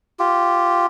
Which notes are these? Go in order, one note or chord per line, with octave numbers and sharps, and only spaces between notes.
F4 G4